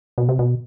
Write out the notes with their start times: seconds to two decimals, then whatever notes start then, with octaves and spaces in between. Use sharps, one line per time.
0.18 B2
0.29 C3
0.39 B2